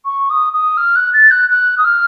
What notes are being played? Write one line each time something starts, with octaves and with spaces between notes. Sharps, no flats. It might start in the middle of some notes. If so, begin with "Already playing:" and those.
C#6
D#6
D#6
F6
F#6
A6
F#6
F#6
D#6
F6